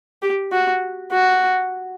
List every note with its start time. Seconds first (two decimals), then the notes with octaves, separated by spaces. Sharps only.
0.22 G4
0.52 F#4
1.12 F#4